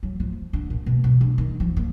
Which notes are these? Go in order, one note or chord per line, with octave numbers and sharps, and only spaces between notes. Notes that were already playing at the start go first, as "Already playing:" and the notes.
F#3
F3
D3
A#2
B2
B2
D3
D#3
F3
A#3